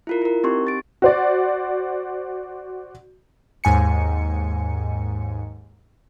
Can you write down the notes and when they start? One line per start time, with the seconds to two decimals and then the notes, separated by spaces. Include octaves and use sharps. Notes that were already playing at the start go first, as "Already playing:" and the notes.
0.07 E4 F4 A#4
0.22 E4 A#4
0.44 C4 D#4 G4 C6 C#6
0.67 A6 D7
1.02 F#4 C5 D5
3.64 D#2 G#2 G#5 C#7